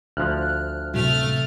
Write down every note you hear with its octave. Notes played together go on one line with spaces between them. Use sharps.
D2 F3 F6 F#6
A2 C3 F#3 A3 F6